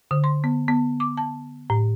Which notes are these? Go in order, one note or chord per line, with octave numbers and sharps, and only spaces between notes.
D3
C6
B3
B3
D6
A5
A2